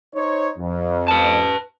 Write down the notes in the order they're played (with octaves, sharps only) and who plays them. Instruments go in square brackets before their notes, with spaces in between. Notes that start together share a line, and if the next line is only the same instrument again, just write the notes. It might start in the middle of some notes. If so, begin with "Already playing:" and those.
[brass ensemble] D#4 C5 C#5
F2
[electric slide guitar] B4 A5